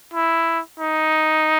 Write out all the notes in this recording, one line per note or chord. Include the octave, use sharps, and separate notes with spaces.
E4
D#4